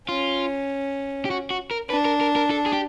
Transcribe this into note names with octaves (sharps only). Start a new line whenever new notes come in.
C#4 F4
G4
F#4
F#4
A#4
D4 B4
A#4
A#4
A#4
A4
G#4
G4